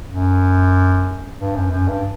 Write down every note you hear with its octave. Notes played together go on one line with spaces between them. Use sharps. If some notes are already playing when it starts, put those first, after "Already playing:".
F#2
G2
F#2
F#2
G2